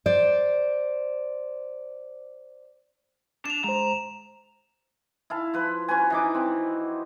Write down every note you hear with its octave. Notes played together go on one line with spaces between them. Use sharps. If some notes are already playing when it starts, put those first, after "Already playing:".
C5 D5
D4 E7 F7
G#3 C5 A#5
E4 F5 A5
F3 B4
C#4 F#4 B4 G#5
E3 D#4 D6
C4